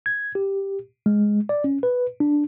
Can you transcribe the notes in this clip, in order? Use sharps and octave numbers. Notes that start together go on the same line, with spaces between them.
G#6
G4
G#3
D5
C#4
B4
D4